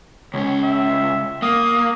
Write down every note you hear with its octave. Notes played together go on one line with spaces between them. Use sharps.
C#2 C#4 C#5
E5
A#3 D#6